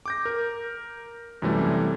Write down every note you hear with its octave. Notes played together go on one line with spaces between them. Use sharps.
D6 G6 A#6
A#4
F#2 C3 E3 G3 A3